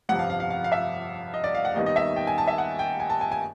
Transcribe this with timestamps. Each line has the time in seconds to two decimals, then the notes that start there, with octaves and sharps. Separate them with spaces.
0.09 G1 F2 C3 F3 F#5
0.19 F5
0.30 F5
0.40 F5
0.50 F5
0.64 F5
0.72 E5
1.34 D#5
1.44 D5
1.55 F5
1.65 F#5
1.75 D#2 D#3 G3 B3 D#4 D#5
1.86 D#5
1.96 E5
2.16 G5
2.27 G#5
2.38 A5
2.48 E5
2.58 F#5
2.79 G5
3.00 G#5
3.10 A5
3.21 G#5
3.32 G#5